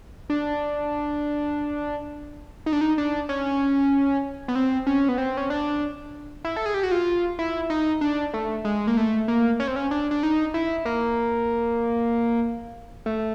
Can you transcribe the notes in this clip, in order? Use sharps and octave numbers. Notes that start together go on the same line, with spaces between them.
D4
D#4
D4
D#4
D4
C#4
B3
C4
C#4
B3
C4
C#4
D4
E4
A4
G#4
G4
F#4
F4
E4
D#4
D4
A3
G#3
A#3
A3
A#3
C#4
C4
C#4
D4
D4
D#4
E4
A#3
A3